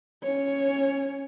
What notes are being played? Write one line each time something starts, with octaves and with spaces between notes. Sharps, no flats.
C#4 C#5